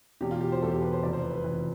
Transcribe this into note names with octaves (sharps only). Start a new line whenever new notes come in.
E1 E2 B2 G4
F4
G4
C5
E1 E2 B2 A4
G4
B4
C5
F1 F2 E3 D5
C5
B4
B4
F1 F2 E3